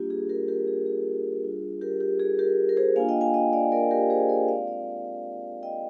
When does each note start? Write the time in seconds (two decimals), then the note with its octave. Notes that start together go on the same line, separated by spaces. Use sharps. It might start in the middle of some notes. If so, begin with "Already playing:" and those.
Already playing: G3 A#3 D4 F4 G4
0.10 G#4
0.29 G4 A#4
0.48 G4 A#4
0.67 G#4
0.86 G#4
1.44 G3 D4 F4
1.81 G4 A#4
2.00 G4
2.20 G#4
2.39 G4 A#4
2.69 A#4
2.77 G#4 C5
2.96 A#3 D4 F4 F5 G#5
3.09 D#5 G5
3.21 F5 G#5
3.34 D#5 G5
3.53 D5 F5
3.72 A#4 D5
3.91 G4 A#4
4.10 G#4 C5
4.29 A#4 D5
4.48 G#3 C4 F4 D5 F5
4.67 D5 F5
5.63 D#5 G5